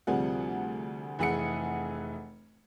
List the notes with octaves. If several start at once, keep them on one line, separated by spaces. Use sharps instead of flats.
D2 C3 F3 G3 G#4 F#5
F1 E3 G#4 F#5 G#5 C#7